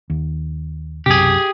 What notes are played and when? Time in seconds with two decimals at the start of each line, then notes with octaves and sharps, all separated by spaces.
0.10 D#2
1.06 B1 F#2 C3 G4 G#4